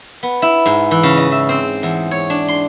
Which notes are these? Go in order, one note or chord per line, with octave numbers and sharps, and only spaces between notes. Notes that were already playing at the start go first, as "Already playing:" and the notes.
B3
E4
G#2
E3
C#3
D#5
E5
C4
E2
C#5
D4
C6